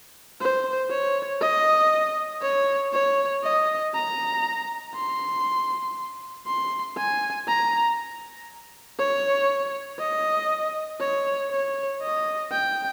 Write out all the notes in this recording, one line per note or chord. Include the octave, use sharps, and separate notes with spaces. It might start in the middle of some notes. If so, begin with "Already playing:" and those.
C5
C#5
D#5
C#5
C#5
D#5
A#5
C6
C6
G#5
A#5
C#5
D#5
C#5
C#5
D#5
G5